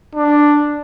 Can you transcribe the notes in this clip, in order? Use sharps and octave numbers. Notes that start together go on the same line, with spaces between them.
D4